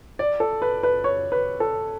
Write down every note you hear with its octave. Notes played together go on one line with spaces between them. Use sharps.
D5
A4
B4
B4
C#5
B4
A4